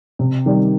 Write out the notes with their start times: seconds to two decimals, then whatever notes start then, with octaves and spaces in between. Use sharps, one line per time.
0.19 C3
0.46 D#3 G3